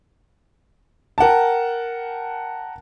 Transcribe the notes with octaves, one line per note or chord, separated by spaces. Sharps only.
A#4 F#5 G5 A5